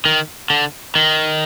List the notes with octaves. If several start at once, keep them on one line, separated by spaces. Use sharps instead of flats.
D#3
D3
D#3